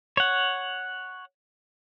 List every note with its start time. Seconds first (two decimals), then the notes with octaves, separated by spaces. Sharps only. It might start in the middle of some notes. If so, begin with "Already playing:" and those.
0.17 C#5 F#5